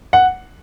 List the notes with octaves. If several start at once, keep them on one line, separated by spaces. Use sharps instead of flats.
F#5